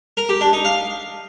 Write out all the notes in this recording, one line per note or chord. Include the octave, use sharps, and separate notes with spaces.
A#4
G4
D4
D#4
F5